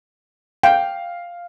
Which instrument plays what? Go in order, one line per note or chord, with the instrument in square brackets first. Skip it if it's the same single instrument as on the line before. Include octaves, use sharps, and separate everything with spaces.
[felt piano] F5 [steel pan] G5